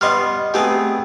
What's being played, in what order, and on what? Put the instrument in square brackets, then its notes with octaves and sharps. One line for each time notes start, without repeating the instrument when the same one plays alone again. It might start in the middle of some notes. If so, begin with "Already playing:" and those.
[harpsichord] G3 B3 C#6 [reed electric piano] D#5 C6 F6
[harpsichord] A3 B3 C4 [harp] G4 G#4 [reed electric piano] G5 D#6